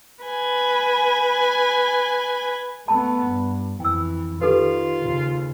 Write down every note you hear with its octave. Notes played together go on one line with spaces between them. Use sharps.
B4 G#5
A3 B3 A5 B5
G2
F2 E3 G5 E6
D#3 F4 G4 A4 B4
D#2 C#3